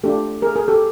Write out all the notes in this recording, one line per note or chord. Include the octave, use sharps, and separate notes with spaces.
A3 D4 F4 G4 A4
G#4 A#4
G#4 A#4
G4 A4